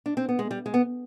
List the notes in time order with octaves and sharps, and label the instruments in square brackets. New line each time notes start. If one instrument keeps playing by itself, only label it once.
[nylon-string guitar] D4
C4
B3
G#3
G3
G#3
B3